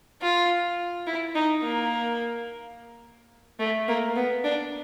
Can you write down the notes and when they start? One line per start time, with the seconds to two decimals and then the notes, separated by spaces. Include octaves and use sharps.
0.22 F4
1.07 E4
1.35 D#4
1.62 A#3
3.59 A3
3.88 A#3
4.16 B3
4.44 D4